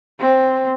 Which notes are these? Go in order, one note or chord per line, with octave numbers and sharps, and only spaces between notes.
C4